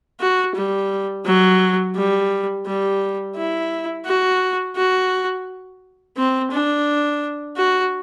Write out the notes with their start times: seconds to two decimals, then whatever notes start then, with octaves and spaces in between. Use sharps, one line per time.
0.20 F#4
0.56 G3
1.26 F#3
1.96 G3
2.67 G3
3.37 E4
4.06 F#4
4.77 F#4
6.17 C4
6.52 D4
7.57 F#4